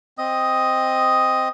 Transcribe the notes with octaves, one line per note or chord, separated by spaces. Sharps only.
C4 D#5 D#6